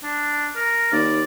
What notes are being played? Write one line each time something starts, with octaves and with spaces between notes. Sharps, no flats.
D4
A#4
D#2 D5